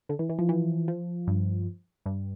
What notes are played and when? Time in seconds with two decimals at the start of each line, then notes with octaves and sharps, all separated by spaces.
0.09 D3
0.19 E3
0.29 E3
0.39 F3
0.49 E3
0.88 F3
1.27 G2
2.06 G2